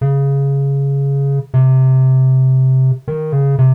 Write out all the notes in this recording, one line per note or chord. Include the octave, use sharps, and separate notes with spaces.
C#3
C3
D#3
C#3
C3